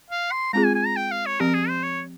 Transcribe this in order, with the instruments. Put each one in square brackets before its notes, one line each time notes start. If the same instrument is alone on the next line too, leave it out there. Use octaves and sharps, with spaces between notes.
[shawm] F5
C6
[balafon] G#3 C4 F4 G#4 [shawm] A#5
[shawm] G#5
G#5
A#5
G5
F5
C#5
[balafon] F3 C4 G4 [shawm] A#4
[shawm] G#4
C5
C#5